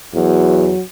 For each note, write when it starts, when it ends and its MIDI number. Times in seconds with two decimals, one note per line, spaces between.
0.14 0.72 40
0.14 0.82 54
0.14 0.82 66